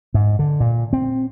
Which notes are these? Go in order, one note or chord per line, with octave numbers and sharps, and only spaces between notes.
G#2
D3
A#2
C4